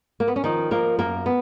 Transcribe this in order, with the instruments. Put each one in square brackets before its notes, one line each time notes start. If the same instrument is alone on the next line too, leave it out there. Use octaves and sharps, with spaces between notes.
[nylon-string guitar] A#3
B3
C#4
D#3 F3 D#4
F3 A#3 A#4
F#2 A#3 A#4
B3